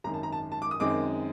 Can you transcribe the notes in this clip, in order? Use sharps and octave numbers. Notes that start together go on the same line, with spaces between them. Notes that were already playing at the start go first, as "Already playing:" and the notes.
G#1 F#2 D#3 A#5
A5
A#5
A5
A5
D6
D#6
F#2 D#3 G#3 C4 D6